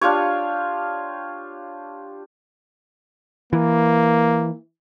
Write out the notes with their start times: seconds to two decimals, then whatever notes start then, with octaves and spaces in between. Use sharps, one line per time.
0.01 D4 F4 G4 C#5
3.53 E3 A#3